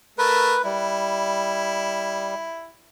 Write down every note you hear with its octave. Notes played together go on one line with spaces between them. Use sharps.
A3 A#4 B4
G3 E4